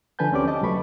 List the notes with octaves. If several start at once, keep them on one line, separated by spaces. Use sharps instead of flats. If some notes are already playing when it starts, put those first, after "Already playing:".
D3 F3 B4 G#5 A5 G6
D2 C4 C#4 G4 D5 D6
B4 D#5 A5 D6
C2 F2 F#3 A3 B5 C#6